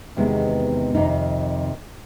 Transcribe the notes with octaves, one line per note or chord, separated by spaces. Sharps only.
E2 C3 D#3 G#3 B3
F2 C3 D#3 D#4